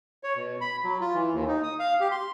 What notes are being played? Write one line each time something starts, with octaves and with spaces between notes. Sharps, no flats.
C#5
B2
B5
F#3
F4
E3
D#2
D#4
D#6
F5
G4
C6